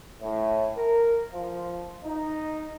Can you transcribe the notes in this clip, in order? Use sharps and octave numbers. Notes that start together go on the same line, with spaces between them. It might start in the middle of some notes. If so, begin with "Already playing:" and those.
A2
A#4
F3
D#4